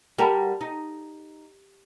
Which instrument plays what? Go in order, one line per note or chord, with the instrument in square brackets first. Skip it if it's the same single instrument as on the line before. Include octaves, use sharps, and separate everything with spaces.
[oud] G3 F#4 A#4 [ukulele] G5 A5 B5
[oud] D#4